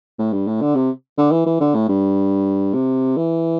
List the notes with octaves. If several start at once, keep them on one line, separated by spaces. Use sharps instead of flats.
A2
G2
A2
D3
C3
D3
E3
E3
D3
A2
G2
C3
E3